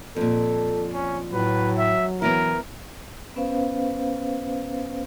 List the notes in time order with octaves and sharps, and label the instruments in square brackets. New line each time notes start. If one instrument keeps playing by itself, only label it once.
[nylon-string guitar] F2 A#2 [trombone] A4
[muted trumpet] C#4
[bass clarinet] A2 [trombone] F#3 [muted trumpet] B4
[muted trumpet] E5
[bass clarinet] E3 [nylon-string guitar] B3 C#4 E4 [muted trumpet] A#4
[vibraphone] B3 C#4 B4 C5 F5